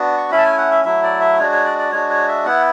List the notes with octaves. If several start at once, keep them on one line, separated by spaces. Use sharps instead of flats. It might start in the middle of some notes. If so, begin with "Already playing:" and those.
Already playing: B3 D4 F#4
C#6
A3 C#4 E4 B5
A5
G#5
F#5
E5
F#3 A3 E4 E5
D5
E5
G#3 D4 F#4 C#5
C#5
D5
D5
G#3 D4 F#4 C#5
C#5
E5
B3 E4 F#5